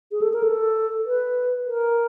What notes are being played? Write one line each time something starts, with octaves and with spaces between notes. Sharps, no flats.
G#4
A4
A#4
A4
B4
A#4